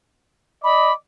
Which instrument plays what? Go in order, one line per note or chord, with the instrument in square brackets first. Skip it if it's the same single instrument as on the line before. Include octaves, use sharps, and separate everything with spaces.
[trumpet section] D5 D#5 D6 [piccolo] B5